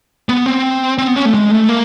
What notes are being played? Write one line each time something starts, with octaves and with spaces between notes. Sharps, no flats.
B3
C4
C4
B3
C#4
A3
G#3
A3
A#3